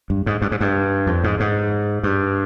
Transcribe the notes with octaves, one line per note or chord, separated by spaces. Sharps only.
G2
G#2
G2
G#2
G2
F2
G#2
G#2
G2